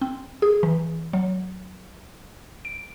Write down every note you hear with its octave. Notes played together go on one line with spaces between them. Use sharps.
C4
G#4
E3
F#3
D7